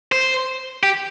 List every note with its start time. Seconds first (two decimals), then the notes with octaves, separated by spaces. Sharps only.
0.12 C5
0.83 G4